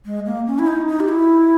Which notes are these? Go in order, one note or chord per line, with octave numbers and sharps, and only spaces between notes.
G#3
A#3
C#4
E4
D#4
D#4
G4
E4